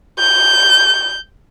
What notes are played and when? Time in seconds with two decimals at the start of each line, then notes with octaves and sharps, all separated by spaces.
0.20 G6